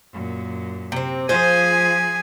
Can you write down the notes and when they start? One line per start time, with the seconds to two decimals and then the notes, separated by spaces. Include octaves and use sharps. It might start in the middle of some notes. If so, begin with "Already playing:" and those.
0.12 F#2 A#2
0.92 C3 C4
1.29 F3 F4 G#4 C5 G#5